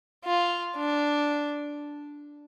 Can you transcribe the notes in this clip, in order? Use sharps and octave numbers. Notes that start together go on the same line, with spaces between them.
F4
D4